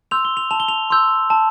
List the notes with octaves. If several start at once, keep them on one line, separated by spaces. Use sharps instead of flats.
C6 E6 G6 F7
G7
F7
A5 F7
G7
F7
C6 E6 G6
A5